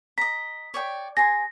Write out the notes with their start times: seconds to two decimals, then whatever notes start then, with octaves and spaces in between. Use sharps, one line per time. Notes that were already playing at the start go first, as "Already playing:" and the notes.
0.18 D#5 A#5 B6
0.74 C#5 D5 G5
1.17 G#4 G#5 C6 A#6